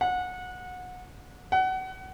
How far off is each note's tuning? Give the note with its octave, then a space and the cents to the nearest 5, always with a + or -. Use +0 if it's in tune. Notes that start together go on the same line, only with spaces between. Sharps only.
F#5 -25
F#5 +25